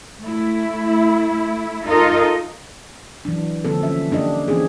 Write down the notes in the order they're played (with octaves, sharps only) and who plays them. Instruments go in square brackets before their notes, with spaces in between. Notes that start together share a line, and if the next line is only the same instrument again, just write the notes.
[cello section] A3 E4
D#4 F4 A4 A#4 D#5
[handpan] E3 F#3 D4
D3 F3 G3 A#3 C4 A4
C#4 E5
A#3 D4 G4 D#5
E3 A#3 C4 C#4 D#4 G#4